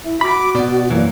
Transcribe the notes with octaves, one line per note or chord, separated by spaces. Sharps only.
E4 E5
F#4 B5 D6
B2 D5
F#2 E3 A#3